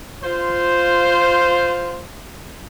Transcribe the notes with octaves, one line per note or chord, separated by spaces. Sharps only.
F4 C5